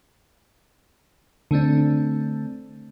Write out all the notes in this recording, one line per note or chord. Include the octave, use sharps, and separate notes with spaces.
D3 A3 C4 D4